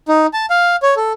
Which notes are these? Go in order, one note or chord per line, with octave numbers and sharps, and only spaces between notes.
D#4
A5
F5
C#5
A4